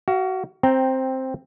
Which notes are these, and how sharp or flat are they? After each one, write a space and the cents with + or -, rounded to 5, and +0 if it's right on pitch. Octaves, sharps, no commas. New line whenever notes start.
F#4 +25 F5 -10
C4 +5 G5 +0 A#5 +5